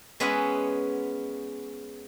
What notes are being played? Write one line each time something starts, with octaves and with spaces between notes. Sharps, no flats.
G#3 B3 C#4 G#4 E5 F#5